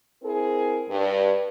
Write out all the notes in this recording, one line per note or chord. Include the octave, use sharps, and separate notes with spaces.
C4 E4 G#4 A#4
G2